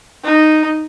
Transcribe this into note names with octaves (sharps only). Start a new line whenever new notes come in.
D#4